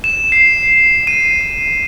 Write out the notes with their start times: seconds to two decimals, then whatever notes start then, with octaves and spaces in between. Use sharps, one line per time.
0.04 E7
0.32 C7
1.07 D#7